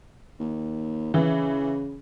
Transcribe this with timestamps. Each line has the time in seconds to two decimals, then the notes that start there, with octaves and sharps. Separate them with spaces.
0.40 D#2
1.14 C#3 E3